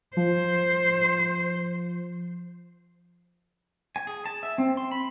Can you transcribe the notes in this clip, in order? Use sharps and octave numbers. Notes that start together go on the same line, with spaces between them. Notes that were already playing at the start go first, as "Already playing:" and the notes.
F3 C5
G#5
G#4
A5
E5
C4
C6
B5